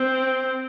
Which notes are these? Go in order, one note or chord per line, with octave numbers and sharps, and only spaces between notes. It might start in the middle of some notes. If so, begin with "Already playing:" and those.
Already playing: C4